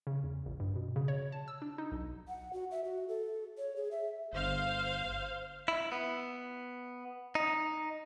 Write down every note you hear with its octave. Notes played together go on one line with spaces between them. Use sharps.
C#3
E2
A#1
G2
B2
C#3
C#5
A5
E6
D4
D#4
B1
F#5
F#4
E5
F#4
A4
C#5
G#4
E5
G1 C5 F5
E4
B3
D#4